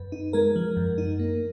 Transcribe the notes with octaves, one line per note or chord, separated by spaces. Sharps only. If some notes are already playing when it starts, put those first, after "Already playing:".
Already playing: F#2 B4
D#4
G#3 A#4
F3
F#2
D#4
A#3